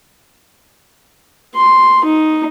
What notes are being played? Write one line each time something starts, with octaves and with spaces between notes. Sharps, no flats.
C6
D#4